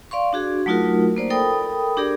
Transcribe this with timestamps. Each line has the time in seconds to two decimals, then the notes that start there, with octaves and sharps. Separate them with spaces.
0.11 D5 F5 C6 C#6
0.33 D4 F#4 G#4
0.66 F#3 A3 D#4 F4 F#4 A#4
1.16 A#3 C5 D5
1.30 A4 A#4 G5 B5 D#6
1.97 D4 G4 G#4 A#4 D5